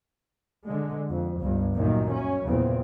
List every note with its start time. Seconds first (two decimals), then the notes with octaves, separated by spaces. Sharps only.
0.67 D3 G#3
1.10 F2
1.39 G1 C#2 G2
1.75 F#2 A#2 D#3
2.13 C#4
2.46 E2 A#2 C#3 C4